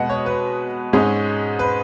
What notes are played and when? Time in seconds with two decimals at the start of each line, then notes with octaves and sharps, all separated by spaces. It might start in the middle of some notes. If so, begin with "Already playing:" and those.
Already playing: B2 G#3 B3 D#5 F#5
0.09 C#5
0.26 B4
0.93 G#2 G#3 C#4 G#4
1.59 B4